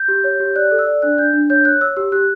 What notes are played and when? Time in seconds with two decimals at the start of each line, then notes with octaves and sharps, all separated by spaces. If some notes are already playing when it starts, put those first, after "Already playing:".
Already playing: G6
0.08 G4
0.24 C#5
0.40 G4
0.55 D5 F#6
0.71 A4
0.79 E6
0.87 D5
1.02 D4 F#6
1.18 D4 G6
1.33 D4
1.50 C#5 G6
1.65 C#5 F#6
1.81 C#5 E6
1.97 G4 E6
2.12 G4 F#6